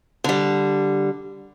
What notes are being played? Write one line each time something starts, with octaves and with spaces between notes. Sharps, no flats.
D3 G3